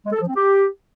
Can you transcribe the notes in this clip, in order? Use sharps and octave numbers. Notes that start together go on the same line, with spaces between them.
G#3
A4
F3
C4
G4